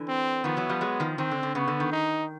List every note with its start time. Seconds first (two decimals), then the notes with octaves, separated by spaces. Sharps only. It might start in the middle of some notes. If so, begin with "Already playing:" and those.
Already playing: D3 E3
0.08 C4
0.44 D#3 F3 B3
0.57 E3 F#3
0.69 F3 G3
0.81 F#3 G#3
1.00 D#3 F3
1.18 D#3 C4
1.31 D3
1.43 D3
1.55 C#3 B3
1.68 D3
1.80 D#3
1.92 D#4